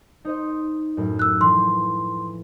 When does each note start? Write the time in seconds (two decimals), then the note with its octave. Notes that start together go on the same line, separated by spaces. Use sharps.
0.25 D#4 C5 D#5
0.97 F#2 A2
1.19 E6 F#6
1.41 E3 F3 C6